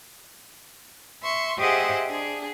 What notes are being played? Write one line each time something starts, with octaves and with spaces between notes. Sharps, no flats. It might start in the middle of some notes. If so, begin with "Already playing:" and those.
E5 C6 C#6
G4 G#4 C5 D#5 E5 F#5
D4 G#4